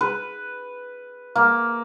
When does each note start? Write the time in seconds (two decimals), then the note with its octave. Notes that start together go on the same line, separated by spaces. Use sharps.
0.01 B4
1.35 A#3